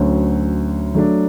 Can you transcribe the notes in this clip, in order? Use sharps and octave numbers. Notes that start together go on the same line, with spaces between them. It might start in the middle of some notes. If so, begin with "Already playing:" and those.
Already playing: D2 D3 F#3 C#4 F#4
F#3 A3 D4